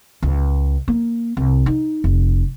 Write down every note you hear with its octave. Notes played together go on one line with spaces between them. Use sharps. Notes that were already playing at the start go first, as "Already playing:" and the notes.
C#2
A#3
C2
D#4
F1